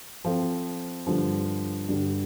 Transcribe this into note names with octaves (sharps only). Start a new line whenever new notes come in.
F3 C4 F4 A4
G2 D3 F3
G2 D3 G3